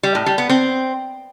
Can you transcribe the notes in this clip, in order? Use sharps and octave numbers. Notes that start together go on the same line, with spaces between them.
G3
A2
G3
B3
C4